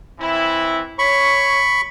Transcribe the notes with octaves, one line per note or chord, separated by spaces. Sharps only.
E3 C4 E4
C#5 B5 C#6